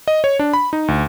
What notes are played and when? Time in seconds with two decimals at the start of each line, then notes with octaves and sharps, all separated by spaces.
0.08 D#5
0.24 C#5
0.39 D4
0.53 B5
0.73 D#4
0.88 D2